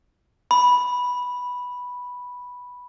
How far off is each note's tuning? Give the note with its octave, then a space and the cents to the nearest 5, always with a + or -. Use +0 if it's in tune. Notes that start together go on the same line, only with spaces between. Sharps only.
B5 -5